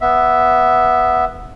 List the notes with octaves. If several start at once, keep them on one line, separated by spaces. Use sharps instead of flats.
B3 E5